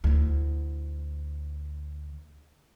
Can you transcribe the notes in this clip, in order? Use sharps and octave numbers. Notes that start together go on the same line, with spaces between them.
D2 E4